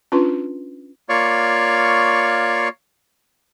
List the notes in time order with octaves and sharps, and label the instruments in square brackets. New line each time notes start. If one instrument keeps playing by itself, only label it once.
[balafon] C#4 D4 F4 B4 C6
[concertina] A#3 F4 C#5 D5 F5 C#6